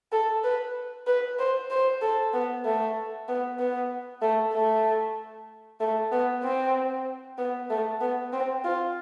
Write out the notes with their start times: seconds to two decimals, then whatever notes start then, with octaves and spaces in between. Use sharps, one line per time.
0.12 A4
0.44 B4
1.07 B4
1.39 C5
1.70 C5
2.01 A4
2.33 B3
2.65 A3
3.28 B3
3.59 B3
4.22 A3
4.54 A3
5.80 A3
6.12 B3
6.43 C4
7.38 B3
7.70 A3
8.00 B3
8.33 C4
8.64 F4